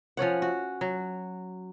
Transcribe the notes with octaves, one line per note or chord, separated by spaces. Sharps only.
F3 C#4 C#5 F#5
F#4
F#3